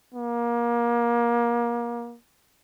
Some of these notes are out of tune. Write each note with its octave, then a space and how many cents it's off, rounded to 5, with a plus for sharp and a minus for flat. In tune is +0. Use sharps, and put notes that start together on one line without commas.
A#3 +25